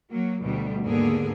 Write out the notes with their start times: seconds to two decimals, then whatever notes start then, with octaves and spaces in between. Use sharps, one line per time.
0.11 F#3 A#3
0.42 D2 B2 G3
0.85 D#2 G#2 D3 A#3 B3 G#4